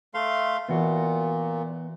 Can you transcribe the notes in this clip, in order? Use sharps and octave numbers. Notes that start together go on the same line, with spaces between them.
A3 E5 F5 C6
A#2 E3 B3 F#4 C#5